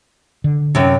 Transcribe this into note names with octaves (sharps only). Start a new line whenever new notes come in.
D3
F#2 C3